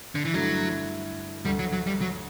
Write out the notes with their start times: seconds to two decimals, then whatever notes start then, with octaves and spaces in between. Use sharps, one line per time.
0.15 D3
0.25 E3
0.34 G2 D3 F#3 A3 E4
1.45 D2 D3 G3 A3
1.59 F#3
1.73 F#3
1.87 G3
2.01 F#3